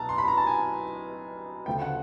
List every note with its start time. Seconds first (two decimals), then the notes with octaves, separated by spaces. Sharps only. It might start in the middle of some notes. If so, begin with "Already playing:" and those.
Already playing: C2 B2 F#3 A5 A#5
0.09 C6
0.18 B5
0.28 A#5
0.37 A5
0.46 G#5
1.66 D2 C#3 F3 A3 G5
1.82 F#5